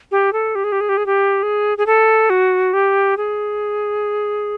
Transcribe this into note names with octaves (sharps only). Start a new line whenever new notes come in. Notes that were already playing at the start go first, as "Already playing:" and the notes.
G4
A4
G4
G#4
G4
G#4
G4
G#4
G4
G#4
G#4
A4
F#4
G4
G#4